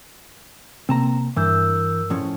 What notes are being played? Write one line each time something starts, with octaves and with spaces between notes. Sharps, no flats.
C3 A#3 C4 A5 A#5
G2 E3 D4 A#4 E6 G6
A2 F3 C#4